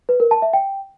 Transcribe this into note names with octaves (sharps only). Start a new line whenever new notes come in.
B4
A#4
A5
E5
G5